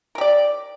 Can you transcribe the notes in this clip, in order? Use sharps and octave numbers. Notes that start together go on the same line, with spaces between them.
G4 A#4 D5